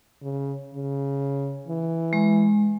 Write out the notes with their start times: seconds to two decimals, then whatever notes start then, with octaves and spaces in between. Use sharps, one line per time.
0.23 C#3
0.75 C#3
1.68 E3
2.13 G#3